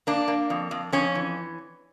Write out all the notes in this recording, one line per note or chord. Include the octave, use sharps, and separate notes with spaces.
A#3 D4
A#3
F2
F2
F2 C#4
E3